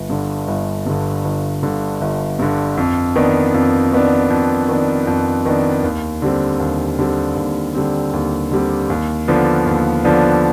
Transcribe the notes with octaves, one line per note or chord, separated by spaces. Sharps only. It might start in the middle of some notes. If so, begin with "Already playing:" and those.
Already playing: G1
G2 D3
G1
G2 D3
G1
G2 D3
G1
G2 D3
F2
D#3 B3 D4
F2
D#3 B3 D4
F2
D#3 B3 D4
F2
D#3 B3 D4
D#2
D3 G3 C4
D#2
D3 G3 C4
D#2
D3 G3 C4
D#2
D3 G3 C4
D#2
D3 F3 B3 D4
D#2
D3 F3 B3 D4